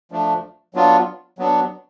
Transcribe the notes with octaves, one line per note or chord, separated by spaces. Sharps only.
F3 A3 D4
F#3 B3 D4 F4
F#3 B3 D4